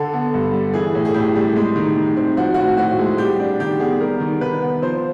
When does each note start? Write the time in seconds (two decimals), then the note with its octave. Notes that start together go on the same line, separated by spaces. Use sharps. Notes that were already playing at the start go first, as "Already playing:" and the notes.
Already playing: D3 A4
0.13 B3
0.34 G2
0.53 G3
0.74 E3 G#4
0.95 A2
1.05 G#4
1.14 A2 G4
1.35 G3
1.56 G#3
1.76 D#3
1.96 D#3
2.17 C4
2.37 F3 F#4
2.54 F#4
2.58 A2
2.77 A2 F#4
2.99 G#3
3.18 G3 G4
3.40 D4
3.60 D#3 G4
3.80 B3 G#4
4.00 G3 A#4
4.20 D#3
4.41 D#3 B4
4.62 B3
4.82 F3 C5